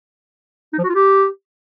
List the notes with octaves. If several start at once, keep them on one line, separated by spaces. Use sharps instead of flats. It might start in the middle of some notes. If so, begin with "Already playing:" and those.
D#4
F3
F#4
F4
G4